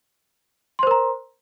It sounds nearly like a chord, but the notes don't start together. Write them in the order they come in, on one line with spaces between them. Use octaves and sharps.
C6 C5 A#4 A#5